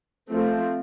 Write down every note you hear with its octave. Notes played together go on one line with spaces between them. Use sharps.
F3 A3 C4